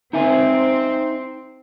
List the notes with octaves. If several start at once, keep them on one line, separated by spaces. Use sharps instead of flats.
C4 D#4 E5 G#5